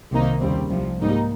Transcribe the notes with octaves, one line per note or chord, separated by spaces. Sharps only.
C2 C3 D#3 A#3 D#4
D#2 C#3 G3 C4
C2 C3 F3
G#2 G3 A#3 D#4